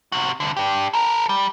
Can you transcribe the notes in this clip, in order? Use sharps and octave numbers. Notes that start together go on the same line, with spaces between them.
C3 F#4
C2 D3
D4 G4
A4 A#4
G3